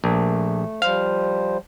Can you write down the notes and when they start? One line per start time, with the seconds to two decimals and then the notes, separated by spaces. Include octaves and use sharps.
0.04 A#1 A3
0.82 F3 G3 C5 F5